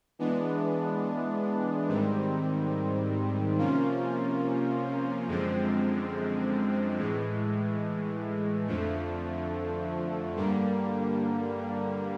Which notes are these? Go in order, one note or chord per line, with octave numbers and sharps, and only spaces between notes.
E3 G#3 B3 D4
G#2 D#3 G3 C4
C3 F3 A#3 C#4 F4
F#2 D3 F3 G#3 C4
A2 E3 G#3
F2 D3 F3 A3
G2 D3 G3 A#3